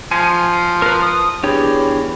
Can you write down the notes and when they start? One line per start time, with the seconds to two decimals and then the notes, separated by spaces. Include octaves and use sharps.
0.11 F3 G#5
0.82 A#4 B4
1.02 D#6
1.43 E2 D4 G4 C#5